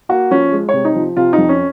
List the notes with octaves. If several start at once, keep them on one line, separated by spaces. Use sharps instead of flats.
A#3 F#4
F3 C#4
G#3
C3 C#5
D#4
F3
C3 F4
D#4
F2
C#4